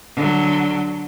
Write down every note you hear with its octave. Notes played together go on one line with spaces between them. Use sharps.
D3 F#3